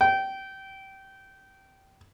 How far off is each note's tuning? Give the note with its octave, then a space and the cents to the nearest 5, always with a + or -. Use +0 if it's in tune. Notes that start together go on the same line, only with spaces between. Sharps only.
G5 -20